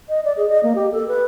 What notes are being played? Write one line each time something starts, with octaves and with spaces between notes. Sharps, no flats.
D#5
D5
G#4
D#5
A#3
G4
A4
B4